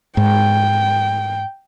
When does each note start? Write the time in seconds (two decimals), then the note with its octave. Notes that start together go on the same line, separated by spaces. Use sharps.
0.17 G#2 G5